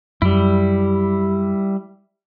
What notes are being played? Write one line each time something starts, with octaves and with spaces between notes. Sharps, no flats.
F#2 G3 E4